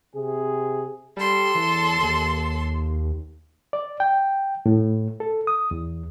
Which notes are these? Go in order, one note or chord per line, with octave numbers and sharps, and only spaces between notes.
C3 G#4
G3 A4 C6
E2
D#2
D5
G5
A2
A4
D#6
E2